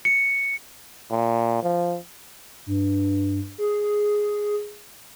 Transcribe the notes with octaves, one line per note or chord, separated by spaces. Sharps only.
C#7
A#2
F3
G2
G#4